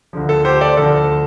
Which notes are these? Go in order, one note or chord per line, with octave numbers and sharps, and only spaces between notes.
D2 D3 F3
A4
G4 C5
A4 D5
D2 D3 F3 A4